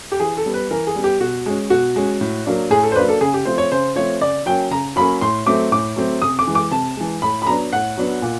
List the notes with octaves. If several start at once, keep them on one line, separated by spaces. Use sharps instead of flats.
G4
E3 G#4
A4
G3 B3
B4
E3 A#4
G#4
G3 B3
G4
B2 F#4
G#3 C#4
B2 F#4
G#3 C#4
A2
F#3 A#3 D4
A2 G#4
A4
C5
F#3 A#3 D4 B4
A4
C#3 G#4
G4
F3 A3 C4 C5
C#5
C#3 C5
F3 A3 C4 C#5
C#3 D5
F#3 A#3 C#4 G5
C#3 A#5
F#3 A#3 C#4 B5
A2 C6
F#3 A3 C4 D6
A2 D6
F#3 A3 C4
C3 D#6
D6
E3 G#3
D6
C3 A5
E3 G#3
A2 B5
B5
F#3 B3 D4 A#5
A2 F#5
F#3 B3 D4
A#2